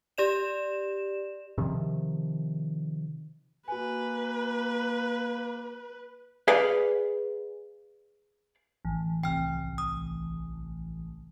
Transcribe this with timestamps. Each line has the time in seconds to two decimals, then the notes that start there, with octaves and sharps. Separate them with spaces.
0.18 G4 D5 E7
1.58 C3 D#3 F3
3.68 A#3 F#4 B4 G#5
6.48 G#4 B4 D5 F5
8.85 A1
9.23 C2 G5 F6
9.78 D#6